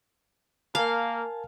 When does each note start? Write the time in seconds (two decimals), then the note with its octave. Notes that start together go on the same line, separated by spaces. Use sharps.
0.75 A#3 A#4 F5 G#5 A5